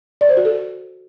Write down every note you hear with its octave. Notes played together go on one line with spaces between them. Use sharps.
D5
C5
F#4
A4